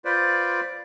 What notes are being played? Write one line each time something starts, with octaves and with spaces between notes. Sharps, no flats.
F4 B4 C5 D5